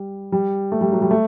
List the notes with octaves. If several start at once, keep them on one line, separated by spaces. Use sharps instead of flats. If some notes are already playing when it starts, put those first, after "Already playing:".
Already playing: G3
G3
A3
G3
F#3
G3
A3